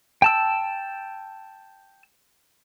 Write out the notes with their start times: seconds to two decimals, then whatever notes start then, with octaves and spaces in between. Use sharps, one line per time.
0.22 G5 A5 E6